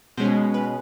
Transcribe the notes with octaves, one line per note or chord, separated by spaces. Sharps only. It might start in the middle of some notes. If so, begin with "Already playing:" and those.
B2 G#3 C#4 C5
B4